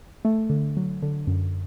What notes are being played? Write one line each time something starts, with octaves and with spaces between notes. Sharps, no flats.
A3
D3
F#3
D3
F#2